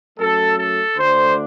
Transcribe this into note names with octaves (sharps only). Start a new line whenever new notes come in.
F#2 F#3 A3 A4
A4
D2 D3 A3 D4 C5